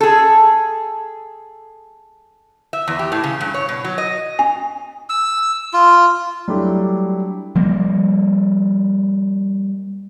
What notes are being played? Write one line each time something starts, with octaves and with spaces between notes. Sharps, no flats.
G#4 A4
E5
E2
G4
A2
C#3
G2
C#5
B2
F#3
D#5
G#5
E6
F4
F#3 G3 A3 D4 E4 G4
F3 G3 A#3